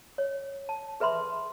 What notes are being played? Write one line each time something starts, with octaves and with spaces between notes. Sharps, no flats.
C#5
A5
G#4 B4 E5 B5 C6